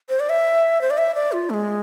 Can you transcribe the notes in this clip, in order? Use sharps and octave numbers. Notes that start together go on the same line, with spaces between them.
C5
D5
E5
C5
D5
E5
D5
F4
A3
G#3